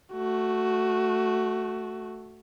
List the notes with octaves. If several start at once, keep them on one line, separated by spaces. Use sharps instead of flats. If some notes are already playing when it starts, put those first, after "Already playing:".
A3 F#4